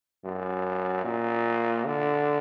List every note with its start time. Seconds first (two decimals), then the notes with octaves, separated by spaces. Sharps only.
0.25 F#2
1.05 A#2
1.85 D3